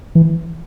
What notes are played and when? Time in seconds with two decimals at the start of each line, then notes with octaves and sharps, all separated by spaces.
0.15 E3